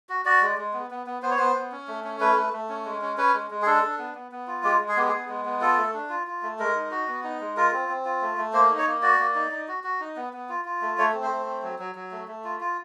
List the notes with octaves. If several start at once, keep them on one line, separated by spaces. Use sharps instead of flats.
F#4
F#4 D5
G#3
G#3
B3
B3
B3
B3 C5
C#5
B3 C5
B3
C#4
A3
C#4
A3 B4
A3
A3
C#4
G#3
C#4
C#4 B4
G#3
G#3
G#4
D4 A4
D4
B3
B3
B3
F4
G#3 G4
G#3
G#4
B3 G4
B3 G#4
G#3
B3
F4 A4
A3
D4
F4
F4
A3
G#3 A#4
D#4
F#4
B3
D#4
G#3
F4 A#4
C4
C4
F4
A3
A3
A#3 C5
D#4
C#5
A#3
F#4 D5
A#3
D#4
D#4
F#4
F#4
D#4
B3
B3
F4
F4
A3
A3 C#5
C4
C5
A3
C4
F#3
F#3
F#3
A3
A3
F4
F4